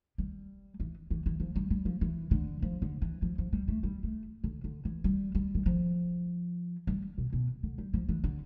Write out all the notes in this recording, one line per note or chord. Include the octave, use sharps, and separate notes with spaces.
G3
E3
E3
E3
F3
G3
G3
F3
E3
D3
F3
D3
E3
F3
F3
G3
A3
G3
A3
D3
D3
E3
G3
G3
E3
F3
G3
B2
B2
D3
G3
F3
E3
D3